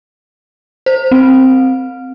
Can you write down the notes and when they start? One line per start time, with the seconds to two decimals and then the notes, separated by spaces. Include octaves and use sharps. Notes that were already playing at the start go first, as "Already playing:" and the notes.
0.86 C5
1.11 C4